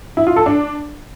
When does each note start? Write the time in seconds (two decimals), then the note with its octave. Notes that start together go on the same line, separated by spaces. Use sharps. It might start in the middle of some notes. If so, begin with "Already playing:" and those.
0.17 E4
0.27 F4
0.36 A4
0.46 D4